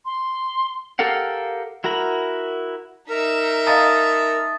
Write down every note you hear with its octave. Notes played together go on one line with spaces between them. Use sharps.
C6
G4 A4 A#4 F5 F#5
E4 F#4 A#4 A#5 B5
D#4 A#4 E5
D#5 F5 A5 A#5 D#6 A6